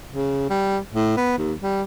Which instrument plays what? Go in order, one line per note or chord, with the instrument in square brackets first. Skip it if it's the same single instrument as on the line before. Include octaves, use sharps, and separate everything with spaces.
[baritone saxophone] C#3
G3
A2
B3
D#2
G3